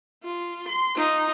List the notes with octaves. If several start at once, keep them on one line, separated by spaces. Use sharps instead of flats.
F4
C6
D#4 F4